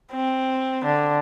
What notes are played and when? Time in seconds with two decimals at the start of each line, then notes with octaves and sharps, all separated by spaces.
0.13 C4
0.85 D3